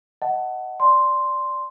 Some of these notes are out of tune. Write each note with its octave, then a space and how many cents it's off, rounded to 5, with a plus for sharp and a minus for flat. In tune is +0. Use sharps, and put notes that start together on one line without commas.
D#5 +10 F#5 +15 A5 +0
D5 +0 A5 +0 C6 +0